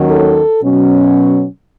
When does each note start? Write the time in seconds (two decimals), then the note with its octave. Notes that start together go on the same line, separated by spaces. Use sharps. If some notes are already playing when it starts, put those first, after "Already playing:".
Already playing: D#2 D#3 F#3 C#4
0.10 A4
0.62 B2 F#3 C#4